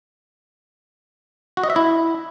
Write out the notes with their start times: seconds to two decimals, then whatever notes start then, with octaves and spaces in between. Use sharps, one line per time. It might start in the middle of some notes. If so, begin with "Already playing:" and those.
1.57 F#4
1.63 D#5
1.70 E5
1.76 E4